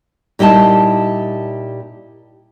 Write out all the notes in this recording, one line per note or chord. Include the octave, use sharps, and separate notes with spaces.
A#2 G3 D#4 E4 A5